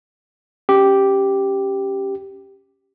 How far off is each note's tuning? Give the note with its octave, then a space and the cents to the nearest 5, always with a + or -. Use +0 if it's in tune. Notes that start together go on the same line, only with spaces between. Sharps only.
C#4 -5 G4 +0